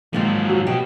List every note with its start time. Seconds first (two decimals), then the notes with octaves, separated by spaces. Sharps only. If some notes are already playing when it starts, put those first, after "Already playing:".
0.13 G#2 D#3 F3 F#3 A#3
0.50 F#4
0.67 B2 G4